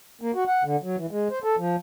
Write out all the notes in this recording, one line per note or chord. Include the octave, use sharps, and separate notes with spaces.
A#3
F#4
F#5
D3
F#3
E3
G#3
C5
A4
F3